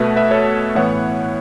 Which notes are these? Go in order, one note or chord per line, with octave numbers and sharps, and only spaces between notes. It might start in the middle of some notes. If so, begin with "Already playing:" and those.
Already playing: B2 A3 B4 E5
B4 E5
A4 C#5
A2 E3 B3 C#5 F#5